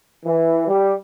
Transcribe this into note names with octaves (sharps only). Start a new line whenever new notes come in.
E3
G3